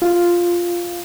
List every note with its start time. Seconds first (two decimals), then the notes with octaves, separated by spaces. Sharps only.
0.02 F4